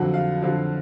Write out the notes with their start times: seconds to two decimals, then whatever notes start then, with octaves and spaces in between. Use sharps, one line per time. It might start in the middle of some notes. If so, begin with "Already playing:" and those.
Already playing: F2 D3 F#3 F#5
0.14 F5
0.42 F2 D3 F#3